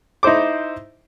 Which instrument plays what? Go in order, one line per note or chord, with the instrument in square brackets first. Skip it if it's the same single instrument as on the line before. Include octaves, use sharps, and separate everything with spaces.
[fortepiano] D#4 E4 C5 D6